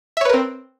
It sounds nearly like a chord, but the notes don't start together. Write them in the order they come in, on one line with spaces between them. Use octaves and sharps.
E5 C#5 B4 A#4 C4